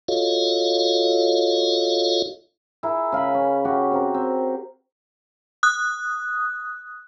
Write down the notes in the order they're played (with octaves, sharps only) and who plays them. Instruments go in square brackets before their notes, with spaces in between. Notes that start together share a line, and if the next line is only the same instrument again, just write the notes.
[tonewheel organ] F4 F#4 A4 C#5 D#5 F5
[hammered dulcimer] E4 G#4 A#4
C#3 F5 G#5 B5
C#4
C#4 F#4 G4
C4 A#4
C4
[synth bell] D#6 F#6